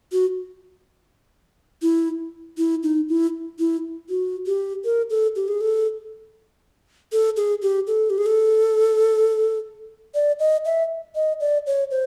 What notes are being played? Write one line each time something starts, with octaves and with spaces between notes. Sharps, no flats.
F#4
E4
E4
D#4
E4
E4
F#4
G4
A#4
A4
G4
G#4
A4
A4
G#4
G4
A4
G4
G#4
A4
D5
D#5
E5
D#5
D5
C#5
C5